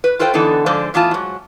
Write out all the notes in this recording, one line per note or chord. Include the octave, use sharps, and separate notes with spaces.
B4
F4 A4 B4 C5 F5 G5
D3 E3 B3 D#4 A4
G#2 D3 F3 A4 C5 D5
A2 E3 B3 F4 A5
G#2 F#3